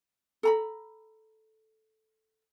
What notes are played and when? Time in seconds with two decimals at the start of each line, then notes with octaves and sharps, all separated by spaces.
0.43 A4 A#5 B5